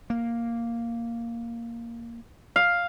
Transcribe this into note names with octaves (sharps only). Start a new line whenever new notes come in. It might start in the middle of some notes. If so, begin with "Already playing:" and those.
A#3
F5